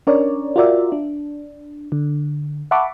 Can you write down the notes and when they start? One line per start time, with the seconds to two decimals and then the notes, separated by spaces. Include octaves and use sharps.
0.07 C#4 D4 A#4 C#5 D5
0.56 F4 F#4 A#4 D5 E5
0.92 D4
1.92 D3
2.71 E5 F#5 A5 B5 C#6 D6